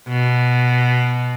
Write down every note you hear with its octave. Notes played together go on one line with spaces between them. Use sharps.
B2